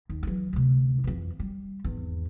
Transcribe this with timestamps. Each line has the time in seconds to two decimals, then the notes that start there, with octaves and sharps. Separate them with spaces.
0.09 D#2
0.23 E3 F#3
0.53 D2 C3
1.04 F2 E3
1.40 G3
1.84 G#1 E2